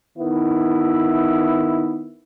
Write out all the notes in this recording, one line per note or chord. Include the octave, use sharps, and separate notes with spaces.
D#3 B3 E4